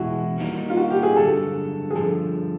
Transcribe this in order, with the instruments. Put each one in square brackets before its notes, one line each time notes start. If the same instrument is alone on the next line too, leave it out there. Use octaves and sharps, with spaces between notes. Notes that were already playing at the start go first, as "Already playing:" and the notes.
Already playing: [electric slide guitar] E2 B2 G#3 [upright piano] E4 F#4
[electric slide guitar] D#3 G3 A#3 D#4
[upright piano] F4
F#4
G4
G#4
[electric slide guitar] G2 D3 F#3 [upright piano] A4
[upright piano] G#4
[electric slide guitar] G2 D3 F3 [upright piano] A4